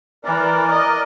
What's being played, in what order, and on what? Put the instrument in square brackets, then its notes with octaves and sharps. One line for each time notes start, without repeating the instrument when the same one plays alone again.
[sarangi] E3 [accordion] A#4 D5
[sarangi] D#5